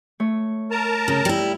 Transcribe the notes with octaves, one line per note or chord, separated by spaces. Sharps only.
A3 C#5
A#4 A5 A#5
C#3
G3 E4